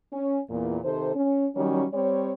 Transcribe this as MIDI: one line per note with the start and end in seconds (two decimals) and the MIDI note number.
0.13 0.40 61
0.50 0.78 40
0.50 0.78 46
0.84 1.15 48
0.84 1.15 51
0.84 1.15 69
0.84 1.15 72
1.16 1.47 61
1.56 1.85 51
1.56 1.85 54
1.56 1.85 55
1.56 1.85 61
1.94 2.32 55
1.94 2.32 60
1.94 2.32 73